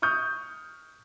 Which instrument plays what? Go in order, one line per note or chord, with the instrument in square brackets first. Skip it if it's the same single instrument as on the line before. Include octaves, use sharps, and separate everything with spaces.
[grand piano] C#6 D#6 F6 G6